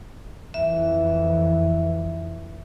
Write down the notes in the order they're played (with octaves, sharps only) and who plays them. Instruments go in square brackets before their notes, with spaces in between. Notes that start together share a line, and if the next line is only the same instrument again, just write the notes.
[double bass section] F2 E3 [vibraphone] E5